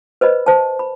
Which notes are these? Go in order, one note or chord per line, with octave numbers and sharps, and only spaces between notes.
B4 C5 D#5 B5
C5 A5
B5